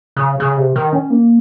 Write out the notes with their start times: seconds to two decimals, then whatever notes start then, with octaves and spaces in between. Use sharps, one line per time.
0.16 C#3
0.40 C#3
0.57 C3
0.76 D#3
0.93 C#4
1.10 A#3